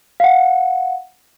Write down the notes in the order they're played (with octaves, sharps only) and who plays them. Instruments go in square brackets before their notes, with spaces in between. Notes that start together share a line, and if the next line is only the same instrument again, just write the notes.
[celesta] F5 F#5